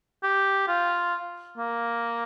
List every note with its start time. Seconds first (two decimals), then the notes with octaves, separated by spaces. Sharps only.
0.23 G4
0.68 F4
1.57 A#3